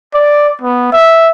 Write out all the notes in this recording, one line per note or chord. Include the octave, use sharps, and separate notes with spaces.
D5
B3
E5